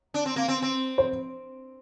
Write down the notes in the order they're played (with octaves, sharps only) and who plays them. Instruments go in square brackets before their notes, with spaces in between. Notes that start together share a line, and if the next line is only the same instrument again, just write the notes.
[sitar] D4
C4
A#3
C4
C4
[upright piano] C5